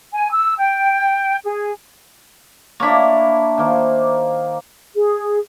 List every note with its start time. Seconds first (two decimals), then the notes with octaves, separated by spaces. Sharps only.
0.12 G#5
0.31 E6
0.58 G5
1.44 G#4
2.80 A#3 D4 E4 C#5
3.58 D#3 A#3 C5
4.95 G#4